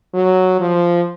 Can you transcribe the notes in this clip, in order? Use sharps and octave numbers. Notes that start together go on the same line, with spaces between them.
F#3
F3